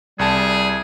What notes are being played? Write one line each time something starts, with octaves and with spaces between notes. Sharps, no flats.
C2 G3 G#4 A5